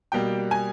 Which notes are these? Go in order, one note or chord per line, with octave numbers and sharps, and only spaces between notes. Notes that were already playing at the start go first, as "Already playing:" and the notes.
B2 G3 A#3 G5
G#5